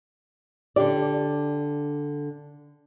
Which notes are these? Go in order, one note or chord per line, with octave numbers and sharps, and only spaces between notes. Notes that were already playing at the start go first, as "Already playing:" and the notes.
D3 D4 G4 D5